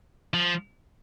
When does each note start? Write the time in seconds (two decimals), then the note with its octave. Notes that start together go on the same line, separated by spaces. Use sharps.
0.34 F3